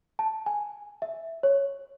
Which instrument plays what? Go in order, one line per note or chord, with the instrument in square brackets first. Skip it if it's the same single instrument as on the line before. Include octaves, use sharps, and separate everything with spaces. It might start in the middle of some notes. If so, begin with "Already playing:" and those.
[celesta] A5
G#5
E5
C#5